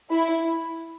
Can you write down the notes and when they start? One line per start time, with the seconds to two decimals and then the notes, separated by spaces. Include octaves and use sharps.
0.10 E4